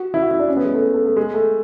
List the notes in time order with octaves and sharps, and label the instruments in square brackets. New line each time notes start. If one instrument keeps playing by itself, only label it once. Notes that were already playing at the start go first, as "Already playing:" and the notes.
Already playing: [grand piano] F#4
E4
F#4
E4
D4
C#4
B3
G#3
A3
A3
A3
G#3
A3